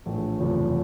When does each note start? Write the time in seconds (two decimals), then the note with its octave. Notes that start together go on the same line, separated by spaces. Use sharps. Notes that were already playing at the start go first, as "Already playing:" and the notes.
0.05 A#1 A2 E3 A3 D4
0.39 F#1 E2 C3 F3 A3